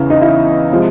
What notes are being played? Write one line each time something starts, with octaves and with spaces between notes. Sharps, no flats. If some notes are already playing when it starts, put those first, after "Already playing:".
Already playing: E2 C#3 E3
D#4
E4
C3 F3 G#3